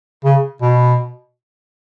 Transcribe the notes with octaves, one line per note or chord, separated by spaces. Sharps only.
C#3
B2